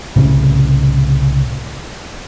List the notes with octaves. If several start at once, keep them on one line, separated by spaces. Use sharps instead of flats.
C2 A2 C#3